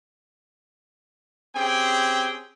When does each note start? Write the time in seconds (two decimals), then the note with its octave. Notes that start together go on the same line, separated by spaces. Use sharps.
1.56 C4 C#4 G4 G#4 G5